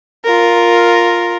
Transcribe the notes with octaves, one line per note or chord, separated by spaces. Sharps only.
F4 A#4